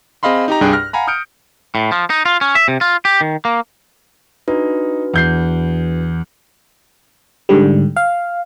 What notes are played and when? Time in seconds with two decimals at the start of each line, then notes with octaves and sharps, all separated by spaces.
0.23 C4 G#4 D#5 F5 B5 C6
0.48 D#4 G4 A#5
0.61 C2 G2 D4 G#4 G5 F#6
0.73 F6 A#6
0.93 F5 F#5 G#5 A#5 B5
1.07 D#6 F6 G6 C#7 D7
1.75 A2
1.92 F3
2.10 D#4
2.26 F4
2.41 C#4
2.55 E5
2.68 C3
2.81 F4
3.05 G4
3.21 D#3
3.45 A#3
4.48 D4 D#4 F#4 B4
5.14 E2 G6 C7
7.49 G#2 D3 G3
7.97 F5